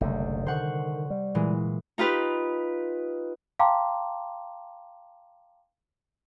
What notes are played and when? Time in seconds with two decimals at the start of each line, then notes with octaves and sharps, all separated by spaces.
0.01 F#1 C2 D3 A3
0.46 D3 D#3 C5 F#5 C#6
1.10 G3
1.35 A#2 E3 G#3
1.98 D#4 F4 G4 B4
3.59 F5 G5 A5 A#5 C6 D6